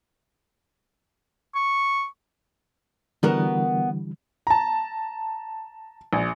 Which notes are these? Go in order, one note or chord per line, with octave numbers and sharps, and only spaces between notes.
C#6
D3 E3 G3 B3 F#4 A#4
A5 A#5
A#1